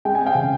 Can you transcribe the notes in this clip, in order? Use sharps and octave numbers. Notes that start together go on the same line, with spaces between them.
G#3 G5
G#5
C4
F5 G5
C#3